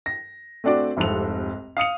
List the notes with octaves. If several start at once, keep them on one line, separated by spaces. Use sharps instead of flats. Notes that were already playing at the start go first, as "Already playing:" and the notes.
A#6
A3 C4 D4 F#4 D5
F1 C2 G#2 F3 A4 F7
F5 D#6 C#7 F7